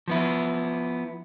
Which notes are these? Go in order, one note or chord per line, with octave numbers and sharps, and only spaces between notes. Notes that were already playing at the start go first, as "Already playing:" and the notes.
F3 B3 E4